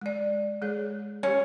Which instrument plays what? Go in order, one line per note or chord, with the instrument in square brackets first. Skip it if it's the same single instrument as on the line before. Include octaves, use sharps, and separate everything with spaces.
[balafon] G#3 D5
G#3 G#4 C#5
[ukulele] C#4 [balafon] G4 C#5